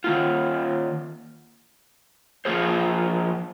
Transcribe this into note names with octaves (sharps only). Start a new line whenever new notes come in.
D#3 A#3 F4
F3 A#3 F4 G#4 C5